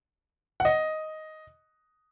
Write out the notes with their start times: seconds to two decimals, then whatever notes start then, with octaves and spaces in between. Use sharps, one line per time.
0.60 F#5
0.65 D#5